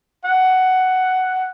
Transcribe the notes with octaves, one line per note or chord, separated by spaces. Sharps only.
F#5